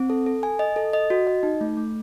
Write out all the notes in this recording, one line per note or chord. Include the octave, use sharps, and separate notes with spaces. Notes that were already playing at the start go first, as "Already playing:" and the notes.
Already playing: C4
A4
A4
G#5
D#5
A4
D#5
F#4
D#5
D#4
A3
A3